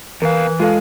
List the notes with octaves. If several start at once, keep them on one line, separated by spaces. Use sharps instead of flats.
E2 E3 A#4 F5
G#3 F4 A4 F5